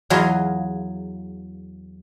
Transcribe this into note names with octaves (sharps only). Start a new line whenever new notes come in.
E2 F#3 F4 G#4 D#5